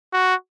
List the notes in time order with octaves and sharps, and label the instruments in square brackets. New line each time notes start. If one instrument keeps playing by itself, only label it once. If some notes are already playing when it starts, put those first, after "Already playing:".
[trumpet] F#4